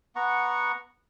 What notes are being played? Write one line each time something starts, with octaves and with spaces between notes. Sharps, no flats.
B3 F#5 A#5 C#6